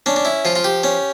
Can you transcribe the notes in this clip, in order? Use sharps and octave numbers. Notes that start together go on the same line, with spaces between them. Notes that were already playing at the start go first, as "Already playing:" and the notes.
C#4 D4
D4
E4
F3 F4
F4
G4
C#4